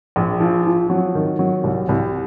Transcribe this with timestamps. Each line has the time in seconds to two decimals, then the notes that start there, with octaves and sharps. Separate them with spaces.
0.16 A#1
0.40 F3
0.66 F3
0.90 F#3
1.15 D#3
1.39 F#3
1.64 C2
1.89 C2